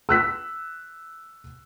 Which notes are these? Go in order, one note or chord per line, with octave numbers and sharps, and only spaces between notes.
E6 F#6 B6